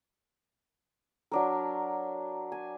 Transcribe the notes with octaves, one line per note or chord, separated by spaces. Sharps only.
F#3 D4 A#4
G#5